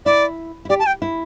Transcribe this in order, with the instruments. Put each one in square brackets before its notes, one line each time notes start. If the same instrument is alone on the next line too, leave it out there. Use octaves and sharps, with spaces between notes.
[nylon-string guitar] E4 [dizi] D5
[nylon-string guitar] E4
[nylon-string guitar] G4 [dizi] D5
[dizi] A5
G5
[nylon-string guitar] E4